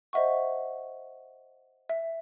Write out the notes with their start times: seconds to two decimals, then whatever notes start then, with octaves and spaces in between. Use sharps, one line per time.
0.13 C5 D#5 E5 F#5 C#6
1.89 E5